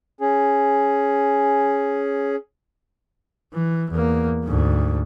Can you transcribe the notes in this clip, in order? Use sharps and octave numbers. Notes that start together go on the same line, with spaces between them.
C#4 G#4
E3
E2 A#3
D2 G#2